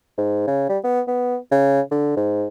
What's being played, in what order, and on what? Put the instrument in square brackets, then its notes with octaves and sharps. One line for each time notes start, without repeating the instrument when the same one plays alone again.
[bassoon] G#2
C#3
G3
B3
B3
C#3
D3
G#2